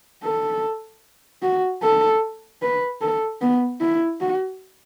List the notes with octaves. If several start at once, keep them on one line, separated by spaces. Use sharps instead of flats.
A4
F#4
A4
B4
A4
B3
E4
F#4